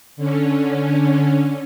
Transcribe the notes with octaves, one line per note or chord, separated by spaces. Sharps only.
D3 C#4